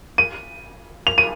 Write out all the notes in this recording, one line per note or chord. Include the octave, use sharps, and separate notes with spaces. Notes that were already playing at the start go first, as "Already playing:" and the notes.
D#7
F7
D#7